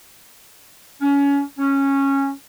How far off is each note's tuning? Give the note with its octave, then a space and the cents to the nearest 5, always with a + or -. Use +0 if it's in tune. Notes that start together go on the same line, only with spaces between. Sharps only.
C#4 +25
C#4 -10